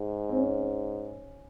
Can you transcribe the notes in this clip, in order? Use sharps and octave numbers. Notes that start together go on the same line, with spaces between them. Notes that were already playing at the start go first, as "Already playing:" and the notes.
Already playing: G#2
C4
C#4